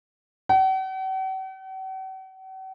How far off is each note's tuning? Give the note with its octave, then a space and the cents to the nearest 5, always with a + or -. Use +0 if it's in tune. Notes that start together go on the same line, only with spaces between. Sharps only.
F#5 +45